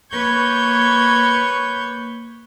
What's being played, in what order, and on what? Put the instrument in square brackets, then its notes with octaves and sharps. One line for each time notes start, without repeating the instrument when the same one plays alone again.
[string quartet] A#3 B4 C#5 C#6 G6 G#6